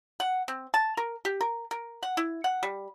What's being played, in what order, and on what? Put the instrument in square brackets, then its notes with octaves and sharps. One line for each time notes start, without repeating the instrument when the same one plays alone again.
[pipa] F#5
C4
A5
A#4
G4
A#4
A#4
F#5
E4
F#5
G3